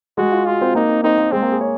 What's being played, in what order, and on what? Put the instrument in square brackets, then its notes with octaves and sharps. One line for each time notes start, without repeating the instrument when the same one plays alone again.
[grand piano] G#3 [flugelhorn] F#4
[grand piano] F4
[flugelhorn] F4 [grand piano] F#4
[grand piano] C4
[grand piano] A#3 [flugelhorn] D#4
[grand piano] C4
[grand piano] C4 [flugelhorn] D#4
[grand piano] A#3
[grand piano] G#3 [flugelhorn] C4
[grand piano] A#3
G#4
C#5